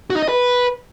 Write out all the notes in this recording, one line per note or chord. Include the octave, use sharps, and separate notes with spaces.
F#4
D#4
D#5
B4